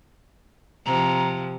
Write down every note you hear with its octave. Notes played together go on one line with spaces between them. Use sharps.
C3 F3 A#5